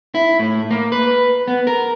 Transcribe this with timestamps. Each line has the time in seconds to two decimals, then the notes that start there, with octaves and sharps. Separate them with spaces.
0.15 E4
0.39 A2
0.71 A#3
0.92 B4
1.48 B3
1.67 A#4